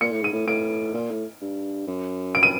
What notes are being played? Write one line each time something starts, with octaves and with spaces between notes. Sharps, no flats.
A#2 C#7
A2
G#2 D#7
A2
A2 D7
A#2
A2
G2
F#2
D7
D#7